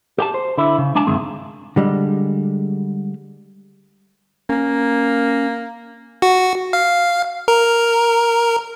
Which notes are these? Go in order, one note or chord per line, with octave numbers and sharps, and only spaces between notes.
G4 G5 A5
C5
D3 E4
C#3
G#3 D4 G#5 A5
D2 G2 D#3 G#3 C4
D3 G3 G#3
A#3 C#4
F#4
F5
A#4